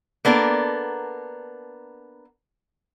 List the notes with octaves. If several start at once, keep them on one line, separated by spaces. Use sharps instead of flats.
A#3 B3 D4 A4 A#4